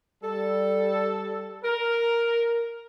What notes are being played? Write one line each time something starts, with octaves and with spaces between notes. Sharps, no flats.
G3 A4
A#4